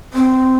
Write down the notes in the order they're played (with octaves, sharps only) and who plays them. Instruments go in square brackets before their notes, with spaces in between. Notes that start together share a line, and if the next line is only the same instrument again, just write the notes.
[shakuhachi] C4